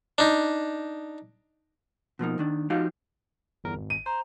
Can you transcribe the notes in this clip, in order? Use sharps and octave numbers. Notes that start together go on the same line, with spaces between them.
D4 D#4
B2 F3 A#3 D#4
D#2 D#3 D4
F3 D#4 F#4 G4 F5
G1 E2 A#4
G#1
D#7
C5 A#5